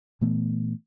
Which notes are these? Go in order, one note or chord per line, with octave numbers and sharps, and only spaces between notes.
A#2 E3 A3 B3